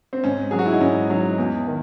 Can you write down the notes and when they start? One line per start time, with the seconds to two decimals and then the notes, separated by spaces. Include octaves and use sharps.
0.13 C4
0.24 G#2 C#4
0.51 F#3 G#4
0.59 F#4
0.66 E4
0.73 D#4
0.81 G#2 C#4
1.10 F#3 D#4
1.38 E2
1.67 D#3